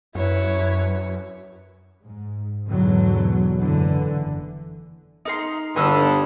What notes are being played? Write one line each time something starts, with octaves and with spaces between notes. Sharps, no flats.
F#2 E4 B4 C#5
G#2
E2 G#2 B2 D3 F#3
F#1 D3 E3
D#4 A#4 C6
G1 G2 D3 D#6 E6